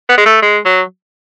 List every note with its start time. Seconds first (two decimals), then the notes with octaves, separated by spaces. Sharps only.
0.09 B3
0.17 G#3
0.26 A3
0.42 G#3
0.65 F#3